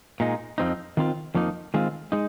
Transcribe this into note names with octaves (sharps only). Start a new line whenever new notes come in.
A#2 G#3 D#4
F2 F3 G#3 C4 D#4
D#3 C4 F4
F2 F3 A#3 D#4
D#3 G#3 C4 F4
G#3 D#4